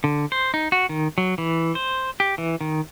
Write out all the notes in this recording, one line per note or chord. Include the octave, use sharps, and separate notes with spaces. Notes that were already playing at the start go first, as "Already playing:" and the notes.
D3
C5
D#4
F#4
D#3
F#3
E3
C5
G4
E3
D#3